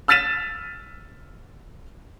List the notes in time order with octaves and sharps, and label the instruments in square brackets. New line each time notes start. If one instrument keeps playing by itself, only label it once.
[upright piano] E6 F6 A6 B6 D#7 E7